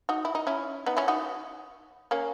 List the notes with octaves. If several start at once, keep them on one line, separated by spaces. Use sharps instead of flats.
D#4 F#4
E4
D#4
C#4 E4
B3 D#4
C#4 E4
D#4 F#4
A#3 C#4